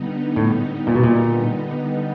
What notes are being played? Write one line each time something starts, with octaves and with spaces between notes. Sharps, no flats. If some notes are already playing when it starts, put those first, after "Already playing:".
Already playing: D3 G3 B3 D#4
A2
A#2
B2
A#2